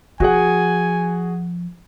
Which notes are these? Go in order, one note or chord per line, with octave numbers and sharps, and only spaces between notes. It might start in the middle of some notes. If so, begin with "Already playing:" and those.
F3 F#4 G#4 F#5 G#5